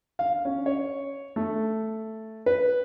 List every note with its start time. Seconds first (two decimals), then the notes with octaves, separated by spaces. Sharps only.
0.19 F5
0.45 C#4
0.66 C#5
1.36 A3
2.46 B4